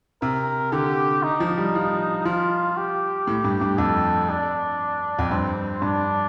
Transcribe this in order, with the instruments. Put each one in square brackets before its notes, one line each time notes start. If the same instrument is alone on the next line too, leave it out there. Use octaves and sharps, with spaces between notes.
[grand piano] C3 [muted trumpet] A#4
[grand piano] D3 [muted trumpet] G4
[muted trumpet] D#4
[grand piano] F3
G3
F3
[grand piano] F3 [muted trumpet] F4
[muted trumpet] G4
[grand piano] A2
G2
G2
[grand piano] F2 [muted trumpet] A4
[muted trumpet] D4
[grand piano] F2
[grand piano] G2 [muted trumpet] C4
[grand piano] G2 [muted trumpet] D4